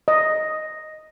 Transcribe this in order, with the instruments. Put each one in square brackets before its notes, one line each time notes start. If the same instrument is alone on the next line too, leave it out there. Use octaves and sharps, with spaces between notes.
[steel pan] D#5